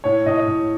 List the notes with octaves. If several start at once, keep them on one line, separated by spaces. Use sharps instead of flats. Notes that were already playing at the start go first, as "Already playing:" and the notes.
A2 C#5
A2 D#5
D#5
A2